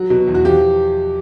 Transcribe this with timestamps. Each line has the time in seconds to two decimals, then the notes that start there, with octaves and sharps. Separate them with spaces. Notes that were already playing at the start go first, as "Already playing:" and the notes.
Already playing: F#3 F#4
0.10 B2
0.28 E2
0.34 F#4
0.45 F3 G4